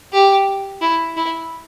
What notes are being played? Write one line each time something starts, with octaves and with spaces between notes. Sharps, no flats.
G4
E4
E4